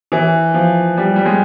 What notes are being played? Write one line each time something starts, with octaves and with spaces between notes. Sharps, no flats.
E3
F3
G3
G3
G#3